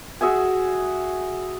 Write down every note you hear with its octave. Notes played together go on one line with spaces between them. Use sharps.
F#4 G#4 E5 G#5